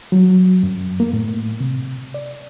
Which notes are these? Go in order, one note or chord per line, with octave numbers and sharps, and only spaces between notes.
F#3
F#2
A#3
A2
C3
D5